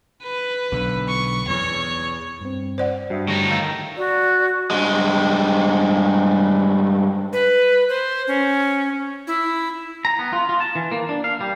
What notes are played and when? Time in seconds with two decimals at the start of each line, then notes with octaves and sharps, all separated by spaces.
0.23 B4
0.72 B1 D3
1.08 C#6
1.48 E2 C#5
2.41 G2 C4
2.78 C5 D5 F#5
3.10 G2 F#4 E5 D#6
3.28 A2 D3 G3 D#4 C#6
3.51 D#3 F5 E6 G6
3.97 F#4 D5
4.71 G2 G#3
7.33 B4
7.89 C5
8.27 C#4
9.27 E4
10.05 A#5
10.19 B3
10.33 F4
10.49 F4
10.60 A5
10.75 E3
10.92 A#3
11.09 D4
11.24 F5
11.41 G3